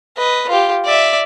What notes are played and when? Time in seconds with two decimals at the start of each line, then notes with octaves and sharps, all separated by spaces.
0.17 B4 D#5
0.49 F4 G4
0.85 D5 E5